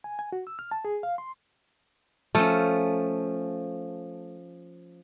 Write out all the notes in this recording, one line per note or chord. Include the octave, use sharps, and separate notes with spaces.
G#5
G#5
F#4
E6
F6
A5
G#4
F5
C6
F3 A3 C#4